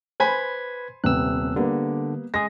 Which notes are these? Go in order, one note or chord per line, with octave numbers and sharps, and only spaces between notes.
B4 C5 G#5 B5 G#6 B6
D#1 C3 B3 E6 F#6
D3 G3 A#3 B3
G#3 G#4 A#6